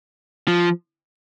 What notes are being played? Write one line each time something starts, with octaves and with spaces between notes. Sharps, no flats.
F3